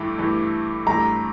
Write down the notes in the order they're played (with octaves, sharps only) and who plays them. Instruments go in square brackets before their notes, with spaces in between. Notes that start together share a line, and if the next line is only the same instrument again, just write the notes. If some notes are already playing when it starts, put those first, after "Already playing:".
Already playing: [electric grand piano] G2 E3 A3 E4 G4
G2 E3 A3 E4 G4
[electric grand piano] G2 E3 A3 E4 G4 [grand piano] A#5